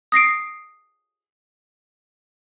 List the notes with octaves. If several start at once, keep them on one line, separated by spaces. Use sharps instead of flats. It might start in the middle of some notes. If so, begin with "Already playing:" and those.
D#6 A#6 C7 D7